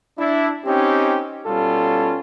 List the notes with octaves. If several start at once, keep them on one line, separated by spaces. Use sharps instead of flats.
D4 E4
C4 C#4 D#4 G4
B2 G3 C#4 F4 A4